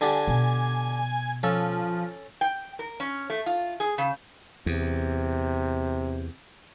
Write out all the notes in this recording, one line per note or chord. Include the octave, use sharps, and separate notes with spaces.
D3 D4 G4 G#5
B2
F3 C#4 A4
G5
A#4
C#4
A3
F4
G#4
C#3
E2 C3